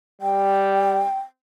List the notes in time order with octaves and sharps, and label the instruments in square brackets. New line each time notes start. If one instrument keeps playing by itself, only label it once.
[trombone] G3 [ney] G5